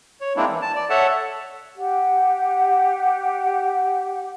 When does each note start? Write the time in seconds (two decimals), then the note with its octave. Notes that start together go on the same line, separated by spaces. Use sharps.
0.21 C#5
0.37 G#3 A#3 C4 D4 E4
0.50 E3
0.62 A5
0.75 D5
0.90 A4 C#5 E5 F#5 A5
1.76 G4 F#5